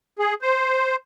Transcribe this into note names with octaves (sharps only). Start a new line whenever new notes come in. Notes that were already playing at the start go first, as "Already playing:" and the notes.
G#4
C5